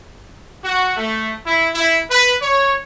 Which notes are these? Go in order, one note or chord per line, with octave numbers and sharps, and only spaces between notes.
F#4
A3
E4
E4
B4
C#5